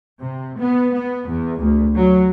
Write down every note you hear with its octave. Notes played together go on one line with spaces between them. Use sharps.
C3
B3
B3
E2
D2
F#3